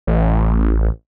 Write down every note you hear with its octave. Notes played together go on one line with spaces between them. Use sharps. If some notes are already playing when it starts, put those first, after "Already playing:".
A1